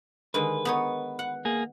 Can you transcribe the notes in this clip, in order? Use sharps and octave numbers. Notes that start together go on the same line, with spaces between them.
D3 D#3 G#3 B4
B3 D#4 C#5
F#5
A#3 G#4